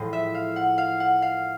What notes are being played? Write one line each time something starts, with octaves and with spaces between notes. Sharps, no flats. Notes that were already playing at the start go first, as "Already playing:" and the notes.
Already playing: A2 F3 G#3
E5
F5
F#5
F5
F#5
F5